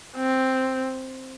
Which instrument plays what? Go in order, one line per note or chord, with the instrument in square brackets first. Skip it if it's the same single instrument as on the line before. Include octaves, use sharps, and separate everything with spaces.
[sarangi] C4